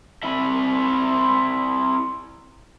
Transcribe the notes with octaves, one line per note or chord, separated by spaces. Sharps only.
C4 E4 E5